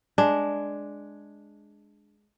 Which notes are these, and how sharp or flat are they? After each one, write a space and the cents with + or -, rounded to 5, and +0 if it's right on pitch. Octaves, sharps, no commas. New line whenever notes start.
G#3 +5 D4 +0